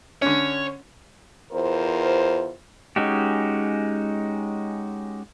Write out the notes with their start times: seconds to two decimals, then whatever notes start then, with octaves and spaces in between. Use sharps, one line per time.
0.22 D3 C#4 C#5
1.52 E2 F4 A#4 C5
2.96 G#3 C#4 D#4 F#4 G4